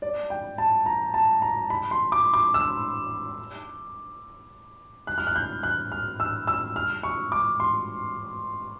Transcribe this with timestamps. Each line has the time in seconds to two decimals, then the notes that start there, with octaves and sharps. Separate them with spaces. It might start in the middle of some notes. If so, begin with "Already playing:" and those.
0.02 D5
0.30 G5
0.58 A5
0.86 A#5
1.14 A5
1.42 A#5
1.70 B5
1.91 C6
2.12 D6
2.34 D6
2.54 E6
5.07 F#6
5.18 F6
5.27 F#6
5.36 G6
5.63 F#6
5.92 F6
6.20 E6
6.47 E6
6.76 F6
7.03 C#6
7.32 D6
7.60 C6